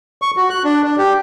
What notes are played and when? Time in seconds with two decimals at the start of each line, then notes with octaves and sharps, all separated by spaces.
0.22 C#6
0.37 F#4
0.50 F#6
0.64 D4
0.84 D4
0.98 G4